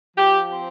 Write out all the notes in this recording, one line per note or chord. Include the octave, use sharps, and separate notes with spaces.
F3 G4
C4